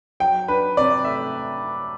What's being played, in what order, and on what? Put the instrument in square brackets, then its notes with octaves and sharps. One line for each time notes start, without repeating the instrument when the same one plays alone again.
[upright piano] F#3 G5
D4 B4
C3 D5
A3 E5